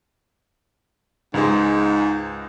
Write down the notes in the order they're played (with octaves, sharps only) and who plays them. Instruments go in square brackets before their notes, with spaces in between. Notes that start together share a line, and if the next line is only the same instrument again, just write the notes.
[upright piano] C#2 G#3 [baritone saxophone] G#2